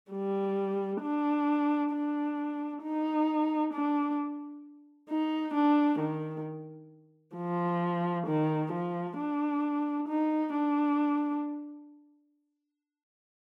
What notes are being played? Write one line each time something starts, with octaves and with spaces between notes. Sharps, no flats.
G3
D4
D4
D#4
D4
D#4
D4
D#3
F3
D#3
F3
D4
D#4
D4